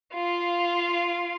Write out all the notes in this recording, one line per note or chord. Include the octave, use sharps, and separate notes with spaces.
F4 F5